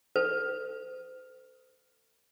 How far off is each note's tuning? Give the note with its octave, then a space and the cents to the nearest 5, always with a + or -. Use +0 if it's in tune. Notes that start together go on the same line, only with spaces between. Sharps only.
A4 +20 C5 -35